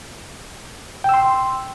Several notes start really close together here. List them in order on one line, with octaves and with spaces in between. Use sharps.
G5 E6 C6